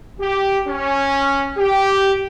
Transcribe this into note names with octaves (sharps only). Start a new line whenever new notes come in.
G4
C#4
G4